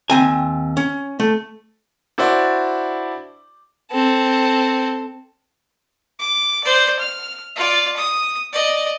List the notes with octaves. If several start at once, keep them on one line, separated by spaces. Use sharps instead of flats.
D#2 C4 G#5
C#4
A3
D4 E4 F#4 C5 D5
C4 A4
D6
C5 D5
F6
F4 D5
D#6
D5 D#5